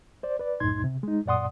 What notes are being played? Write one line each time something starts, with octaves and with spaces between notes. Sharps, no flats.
C5 D5
B4 D5
C2 F#2 A2 D#4 C6 G#6
C3
G#3 D#4
F#2 A#2 D5 F#5 C6 D#6